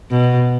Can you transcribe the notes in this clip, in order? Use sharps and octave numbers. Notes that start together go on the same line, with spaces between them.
B2